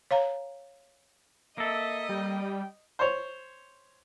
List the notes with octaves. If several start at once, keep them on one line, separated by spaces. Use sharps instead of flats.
C#5 F5 A#5
A#3 A4 D#5 E5
G3 G5
C5 C#5